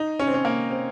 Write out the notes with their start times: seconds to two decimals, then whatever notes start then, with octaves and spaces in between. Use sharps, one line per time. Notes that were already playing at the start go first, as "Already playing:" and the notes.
Already playing: D#4
0.20 C#4
0.27 C4
0.34 C#4
0.45 A#3
0.71 C4